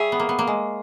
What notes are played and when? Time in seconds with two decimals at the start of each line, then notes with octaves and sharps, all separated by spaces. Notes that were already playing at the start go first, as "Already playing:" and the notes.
Already playing: G3 G#4 C#5 E5
0.12 B3
0.20 A#3
0.29 B3
0.39 A#3
0.47 G#3